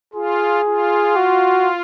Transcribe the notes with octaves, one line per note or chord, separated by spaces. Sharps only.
F4 G#4
F4
F#4